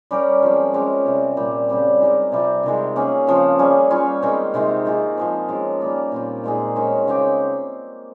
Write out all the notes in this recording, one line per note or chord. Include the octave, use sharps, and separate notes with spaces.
G3 C#4 G4 A#4
F3 G#3 C4
G#3 C#4 G4
C3 G3 C4
A#2 G3 C4
C#3 G3 C4
G#3 D#4 G4 A#4
C3 G3 C4 F4
C3 D#3 G#3
A#3 C#4 G#4
C#3 F3 C4
G3 C#4 G#4
G3 C#4 F4
D#3 G#3 C4 D#4
C3 D#3 G#3 C4
D#3 A#3 F4 G#4
F3 G#3 C4
G#3 C#4 F4 A#4
G3 A#3 F4
A#2 G3 C4
A#2 G#3 D#4 G#4
D#3 G#3 C#4
C#3 G#3 C4 G4